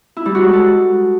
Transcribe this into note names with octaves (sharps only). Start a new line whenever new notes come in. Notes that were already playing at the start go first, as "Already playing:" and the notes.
E4
G3
F#4
G#3
A4